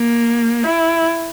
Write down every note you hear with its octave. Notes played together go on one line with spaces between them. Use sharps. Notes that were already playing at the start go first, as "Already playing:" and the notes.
Already playing: A#3
E4